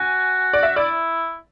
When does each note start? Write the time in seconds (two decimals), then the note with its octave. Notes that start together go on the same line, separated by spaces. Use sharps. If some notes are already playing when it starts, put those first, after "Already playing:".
Already playing: F#4 G#5
0.53 D5
0.63 E5
0.76 E4 D5